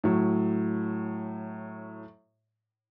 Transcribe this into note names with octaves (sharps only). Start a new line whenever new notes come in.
A2 F#3